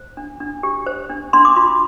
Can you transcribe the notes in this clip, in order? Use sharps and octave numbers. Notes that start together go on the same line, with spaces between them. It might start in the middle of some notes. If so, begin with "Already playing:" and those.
Already playing: C5
D4
D4
G4
C5
D4
D4 C6
D6
F4 C6